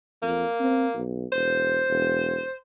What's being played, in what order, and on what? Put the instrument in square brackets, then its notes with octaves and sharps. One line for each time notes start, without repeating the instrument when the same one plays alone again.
[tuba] F2 [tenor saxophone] A#3
[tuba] C4
B1
[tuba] E1 [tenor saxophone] C5
[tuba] E1